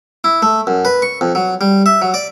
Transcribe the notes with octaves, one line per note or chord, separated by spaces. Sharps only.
E4
A3
F#2
B4
C#6
F2
F#3
G3
E5
F#3
D5